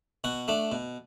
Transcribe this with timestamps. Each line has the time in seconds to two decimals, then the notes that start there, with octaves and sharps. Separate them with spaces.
0.24 B2 F#4
0.48 A3 D4
0.72 B2